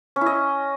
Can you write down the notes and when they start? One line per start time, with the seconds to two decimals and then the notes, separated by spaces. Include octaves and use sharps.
0.16 C#4
0.21 E4
0.26 D#5